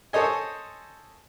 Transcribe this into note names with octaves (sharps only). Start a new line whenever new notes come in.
A4 C5 C#5 D#5 G#5